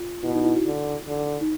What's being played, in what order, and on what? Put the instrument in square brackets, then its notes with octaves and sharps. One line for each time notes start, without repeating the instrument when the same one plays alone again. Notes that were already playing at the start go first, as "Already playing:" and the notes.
Already playing: [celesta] F4
[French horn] B2 [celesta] E4
[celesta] D#4
E4
F#4
[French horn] D3
D3
[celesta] D#4